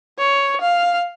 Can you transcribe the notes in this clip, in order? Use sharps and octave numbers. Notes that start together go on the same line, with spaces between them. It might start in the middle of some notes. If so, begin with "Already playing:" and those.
C#5
F5